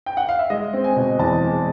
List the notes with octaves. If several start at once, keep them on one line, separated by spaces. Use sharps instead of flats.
G5
F#5
F5
E5
G#3 D#5
C4
G#5
B2
E2 A5
G#3